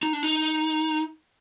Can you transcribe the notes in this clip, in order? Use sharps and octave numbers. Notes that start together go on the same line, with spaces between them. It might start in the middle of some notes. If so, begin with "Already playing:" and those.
D#4
D4
D#4